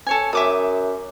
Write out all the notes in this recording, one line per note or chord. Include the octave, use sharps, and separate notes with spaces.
A4 C#5 G#5
F#2 E5 D6 D#6